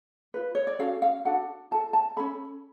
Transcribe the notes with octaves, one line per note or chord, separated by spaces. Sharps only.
F4 B4
C#5
D5
C#4 F#4 A4 F5
F5
D4 F#4 A4 F#5
F4 A4 A5
A5
C#4 F4 A4 B5